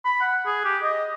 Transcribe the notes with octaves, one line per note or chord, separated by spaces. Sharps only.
B5
F#5
G#4
G4
D#5